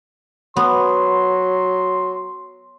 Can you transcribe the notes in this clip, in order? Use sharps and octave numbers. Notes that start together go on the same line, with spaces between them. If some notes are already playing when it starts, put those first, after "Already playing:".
F#3 B3 C6